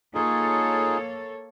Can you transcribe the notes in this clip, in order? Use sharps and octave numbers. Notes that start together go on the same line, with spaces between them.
A#3 D#4 F4 G#4 A4 C#5